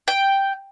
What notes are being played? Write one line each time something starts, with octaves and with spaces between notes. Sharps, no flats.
G5